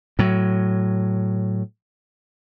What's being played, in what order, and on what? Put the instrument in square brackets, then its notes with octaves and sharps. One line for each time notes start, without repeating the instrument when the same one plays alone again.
[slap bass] A2 F#3